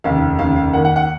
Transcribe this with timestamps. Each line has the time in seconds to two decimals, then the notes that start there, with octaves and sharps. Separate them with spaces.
0.04 F1 D#2 C#3 F5
0.39 F1 D#2 C#3 F5
0.56 F5
0.73 D#2 D#3 A#3 F#5
0.85 F#5
0.96 F#5